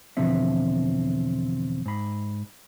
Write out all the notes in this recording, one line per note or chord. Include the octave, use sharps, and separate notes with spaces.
E2 B2 D3 F3 C4 E5
G#2 B5